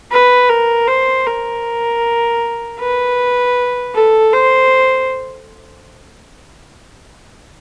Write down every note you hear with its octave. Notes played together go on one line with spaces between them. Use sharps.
B4
A#4
C5
A#4
B4
A4
C5